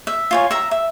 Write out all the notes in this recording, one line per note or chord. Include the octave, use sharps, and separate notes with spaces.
E5
F4 C#5 G#5
E5 A#5
E5